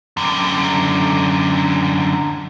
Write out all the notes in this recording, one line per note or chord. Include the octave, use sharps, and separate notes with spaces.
F#2 D3